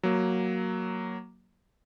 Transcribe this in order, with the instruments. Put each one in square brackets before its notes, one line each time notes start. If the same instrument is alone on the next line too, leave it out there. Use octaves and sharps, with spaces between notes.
[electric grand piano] F#3 A#3